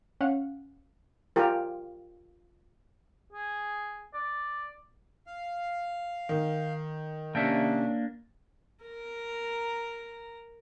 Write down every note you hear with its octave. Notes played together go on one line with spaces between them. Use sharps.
C#4 F5 F#5
F4 G4 A#4
G#4
D5
F5
D#3
C3 A#3 C#4 D4 E5 G5
A#4 A#5